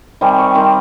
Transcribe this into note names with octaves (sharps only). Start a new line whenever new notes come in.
C3 D#3 G3 C4 G#5
C#6
C3 D#3 G3 C4 D6